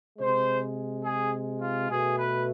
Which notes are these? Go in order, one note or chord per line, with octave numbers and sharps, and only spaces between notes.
C3 G#3 C5
G#4
F4
B2 A3 G#4
B4